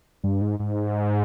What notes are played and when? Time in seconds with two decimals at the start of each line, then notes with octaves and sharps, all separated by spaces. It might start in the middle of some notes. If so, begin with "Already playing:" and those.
0.24 G2
0.41 G#2
0.59 G#2